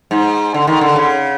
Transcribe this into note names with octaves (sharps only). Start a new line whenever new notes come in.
G#2
D3
D#3
D3
C#3